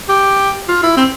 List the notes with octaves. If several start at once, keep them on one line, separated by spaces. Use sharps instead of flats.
G4
F4
E4
C4